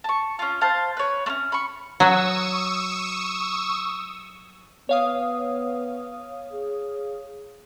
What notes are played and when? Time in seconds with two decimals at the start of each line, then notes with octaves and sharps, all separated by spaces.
0.04 A5 C#6
0.39 C#4 F4
0.61 C5 F5 A5
0.97 B4 C#5
1.26 A3 C#4
1.52 B5 C#6
2.00 F#3 C#6 D#6 E6
4.89 B3 C#5 F5 D#6
6.53 G#4